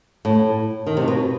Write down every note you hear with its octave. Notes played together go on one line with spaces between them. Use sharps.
A2
D#3
C3
B2